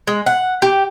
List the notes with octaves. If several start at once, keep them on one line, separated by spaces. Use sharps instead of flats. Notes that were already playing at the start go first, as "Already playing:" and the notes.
G#3
F#5
G4